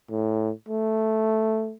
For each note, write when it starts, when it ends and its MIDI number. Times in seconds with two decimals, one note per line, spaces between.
0.11 0.51 45
0.69 1.75 57